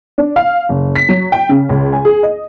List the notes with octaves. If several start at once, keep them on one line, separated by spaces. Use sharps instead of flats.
D4
F5
F#1
B6
F#3
G5
C#3
C#2
G#5
G#4
D#5